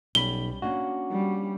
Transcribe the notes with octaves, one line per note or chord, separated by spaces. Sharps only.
B1 G3 C#4 B5 G7
A#3 C#4 D4 F#4
G3